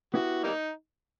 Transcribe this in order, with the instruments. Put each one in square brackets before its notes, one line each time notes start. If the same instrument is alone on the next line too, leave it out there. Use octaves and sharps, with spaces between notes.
[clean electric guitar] B3 E4 G4 [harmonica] F#4
[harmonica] G3 A#3 D#4